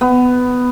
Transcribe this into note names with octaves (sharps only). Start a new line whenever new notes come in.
B3